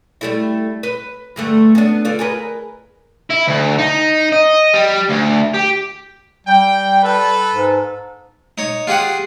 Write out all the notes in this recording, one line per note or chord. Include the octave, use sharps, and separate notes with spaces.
G3 A3 E4
B4
G2 D3 A3
B3 D4
D3 F4
G#4 A#4 B4
E4
D2
D#4
D#5
G3
D2
G4
G3 G5
A4 B4
G#2
D#4 C#5
F4 G4 G#4 F#5